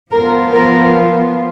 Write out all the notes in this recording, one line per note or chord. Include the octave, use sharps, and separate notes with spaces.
F3 B3 F4 A#4
A#4